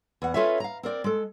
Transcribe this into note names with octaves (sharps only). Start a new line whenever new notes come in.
E2 F#5
C#4 F4 A4 B4 C#5 E5
F5 A#5
C4 A#4 D5
G#3 A4